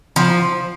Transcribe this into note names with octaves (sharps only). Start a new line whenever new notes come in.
F3